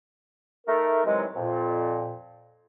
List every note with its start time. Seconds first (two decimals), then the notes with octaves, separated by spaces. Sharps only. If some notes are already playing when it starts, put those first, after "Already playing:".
0.67 A3 D#4 A#4
1.05 C3 D#3 E3 F#3 G#3
1.36 F2 A#2